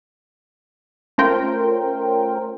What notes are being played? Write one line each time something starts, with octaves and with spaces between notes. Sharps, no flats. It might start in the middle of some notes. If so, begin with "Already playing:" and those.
A3 C#4 F4 A#4 C5 G5